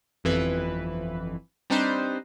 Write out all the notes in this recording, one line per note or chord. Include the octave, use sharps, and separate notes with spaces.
G1 F2 E3 B4
G3 C4 D4 D#4 B4 C5